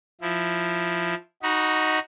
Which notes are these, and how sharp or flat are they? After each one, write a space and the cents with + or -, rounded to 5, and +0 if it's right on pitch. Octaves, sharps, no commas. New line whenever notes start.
F3 +0 E4 +0
D#4 +0 F#4 +0 B5 -30